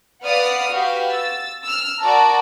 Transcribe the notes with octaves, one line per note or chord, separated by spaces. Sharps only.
B4 D5 F5 F#5 D#6 F6
F#4 G4 B4 F5
E6 A6
E6 F6
F#4 A#4 D5 A5 A#5